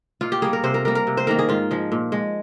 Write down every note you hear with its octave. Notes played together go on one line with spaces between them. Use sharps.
A#2 F4
G4
G3 A#3 G#4
A#4
C3 C5
A#4
G3 A#3 A#4
A#4
C3
C5
D#3 A#3 A#4
G#4
G#2 F4
F3 G#3
A#2
G#3